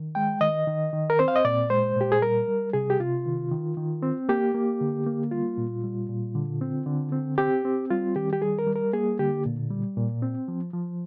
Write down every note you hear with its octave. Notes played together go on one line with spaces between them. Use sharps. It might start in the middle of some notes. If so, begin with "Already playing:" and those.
Already playing: D#3
G#3 G5
D#3 D#5
D#3
D#3
A#4
C4 C5
F5
D#5
A#2 D5
G#3 C5
A#2 G4
G#4
G3 A#4
G3
C3 G#4
G4
C3 F4
D#3
D#3
D#3
C4
A#3 G4
A#3
D3
A#3
G3 F4
A#2
G3
A#2
D3
C4
D3
C4
C4 G4
C4
G3 F4
D#3 G4
G4
G3 G#4
A#4
G3
A#4
A#3 G#4
D3 G4
A#2
G3
A#2
C4
F3
F3